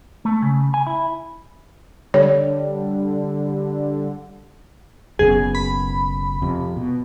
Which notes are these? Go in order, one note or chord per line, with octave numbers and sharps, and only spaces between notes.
A3
C#3
G#5
E4
D3 G3 C#5
F#1 F#2 B2 G#4
B5
F2 C3
B2